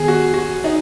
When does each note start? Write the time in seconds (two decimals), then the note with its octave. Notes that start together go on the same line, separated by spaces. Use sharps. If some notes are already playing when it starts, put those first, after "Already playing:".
Already playing: D#3 B3 G#4
0.08 F#4
0.34 F#4
0.64 D#4